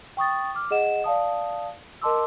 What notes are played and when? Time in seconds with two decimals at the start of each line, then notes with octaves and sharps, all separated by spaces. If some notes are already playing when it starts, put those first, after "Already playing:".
0.17 G5 C#6 D#6 A6
0.55 D6 F6
0.71 G#4 D#5 F#5 E7
1.04 D5 F5 A5 D#6
2.02 A#4 D#5 A5 C6 D6 E6